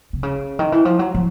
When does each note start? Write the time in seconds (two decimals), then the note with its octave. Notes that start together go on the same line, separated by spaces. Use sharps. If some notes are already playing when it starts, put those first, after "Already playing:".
0.13 C3
0.23 C#3
0.59 D#3
0.72 E3
0.85 F3
0.99 F#3
1.15 F3